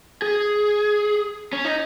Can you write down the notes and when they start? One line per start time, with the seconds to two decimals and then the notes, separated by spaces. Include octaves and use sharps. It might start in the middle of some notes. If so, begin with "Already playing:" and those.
0.22 G#4
1.53 C#4
1.65 D#4